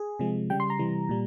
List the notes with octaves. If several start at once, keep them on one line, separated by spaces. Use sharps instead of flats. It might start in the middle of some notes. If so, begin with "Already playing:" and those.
Already playing: G#4
C3 F3 G#3
C#3 G3 G5
C6
A#5
C3 E3 G3
A#2 G3